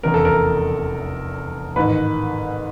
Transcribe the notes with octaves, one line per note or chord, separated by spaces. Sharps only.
F1 E2 C#3 A#4
A4
A#4
A1 G#2 D#3 B4